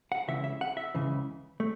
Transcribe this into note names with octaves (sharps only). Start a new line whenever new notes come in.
F#5
C#2 C#3 E3 E5
E5
F#5
E5
C#2 C#3 E3
A3